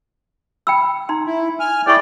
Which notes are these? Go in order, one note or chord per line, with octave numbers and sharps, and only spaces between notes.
G5 B5 E6
D#4 A#5 C6
E4
G#5 F6
E4 G#4 C#5 D5 G5 C#6